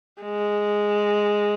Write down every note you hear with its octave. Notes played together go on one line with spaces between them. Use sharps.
G#3